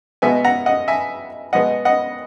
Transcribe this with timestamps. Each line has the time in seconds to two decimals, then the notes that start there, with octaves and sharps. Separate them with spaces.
0.22 B2 G#3 B3 E5 G#5
0.44 F#5 A#5
0.66 D#5 F#5
0.88 E5 G#5
1.53 B2 G#3 B3 D#5 F#5
1.85 D#5 F#5